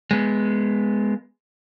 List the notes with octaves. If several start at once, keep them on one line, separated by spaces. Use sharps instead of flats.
G#3 B3